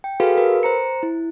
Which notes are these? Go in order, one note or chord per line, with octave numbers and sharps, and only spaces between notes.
G5
F#4 G#4 A4 B4 F5
A#4 B4
C5 A#5 C#7
E4